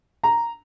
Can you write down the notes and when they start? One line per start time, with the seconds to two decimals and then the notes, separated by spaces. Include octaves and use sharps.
0.24 A#5